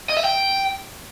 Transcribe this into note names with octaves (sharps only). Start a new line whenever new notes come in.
D#5
E5
G5